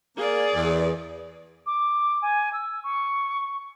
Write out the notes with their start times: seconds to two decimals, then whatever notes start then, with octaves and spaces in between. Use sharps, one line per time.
0.17 A#3 G#4 D5
0.54 E2
1.66 D6
2.22 G#5
2.53 E6
2.84 C#6